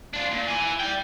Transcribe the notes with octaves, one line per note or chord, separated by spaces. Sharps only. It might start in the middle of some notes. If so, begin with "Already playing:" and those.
D4 F4
A#2
E4 G#5
D5 G5